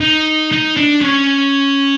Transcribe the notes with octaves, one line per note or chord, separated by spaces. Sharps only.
D#4
D#4
D4
C#4